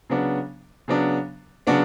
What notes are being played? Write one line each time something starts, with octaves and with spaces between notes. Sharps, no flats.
C#3 F#3 B3 D4
C#3 F#3 B3 D4
C#3 F#3 B3 D4